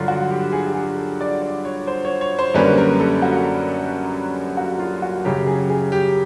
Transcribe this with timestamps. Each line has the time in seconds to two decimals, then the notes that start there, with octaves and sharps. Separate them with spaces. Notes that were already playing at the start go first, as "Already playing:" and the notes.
Already playing: G2 D3 F#3 F4
0.08 F#4
0.31 G4
0.52 G#4
0.66 G4
0.74 G#4
0.98 A4
1.21 D5
1.42 D5
1.65 C#5
1.87 C5
2.05 C#5
2.21 C#5
2.39 C5
2.54 F#2 D3 G3 A#3 C#4 B4
2.78 A#4
3.00 A4
3.22 F#4
4.57 F#4
4.79 F4
5.02 F#4
5.25 F#2 C#3 F#3 G4
5.47 G#4
5.70 G#4
5.92 G4